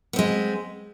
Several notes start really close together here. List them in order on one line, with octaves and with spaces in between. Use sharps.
B3 C4 G#3